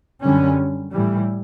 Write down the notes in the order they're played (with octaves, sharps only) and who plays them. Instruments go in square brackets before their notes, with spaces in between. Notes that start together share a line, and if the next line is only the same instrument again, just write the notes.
[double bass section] F#2 D3 G3 C#4
A2 E3 G3